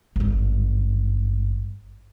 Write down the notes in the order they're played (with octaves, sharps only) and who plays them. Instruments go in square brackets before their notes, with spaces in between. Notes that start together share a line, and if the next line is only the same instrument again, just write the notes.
[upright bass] G#1 G2